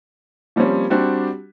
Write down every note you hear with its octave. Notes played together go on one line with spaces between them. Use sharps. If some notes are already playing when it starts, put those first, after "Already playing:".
F3 G3 A#3 C4 C#4
G3 C4 D4 F#4 G4